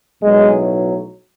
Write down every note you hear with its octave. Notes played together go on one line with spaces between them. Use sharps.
B1 A2 F#3 G#3